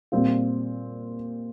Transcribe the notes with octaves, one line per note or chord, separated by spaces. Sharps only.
A#2 G3 C4 F4